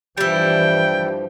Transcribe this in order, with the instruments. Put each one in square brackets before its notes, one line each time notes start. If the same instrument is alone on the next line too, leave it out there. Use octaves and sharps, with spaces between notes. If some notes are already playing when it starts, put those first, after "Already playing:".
[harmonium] G2 F3 [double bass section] E3 [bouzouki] G3 E4 [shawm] G5